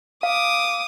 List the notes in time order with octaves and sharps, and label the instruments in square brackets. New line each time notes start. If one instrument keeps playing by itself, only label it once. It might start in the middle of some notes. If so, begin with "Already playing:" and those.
[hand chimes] F5 [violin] D6 D#6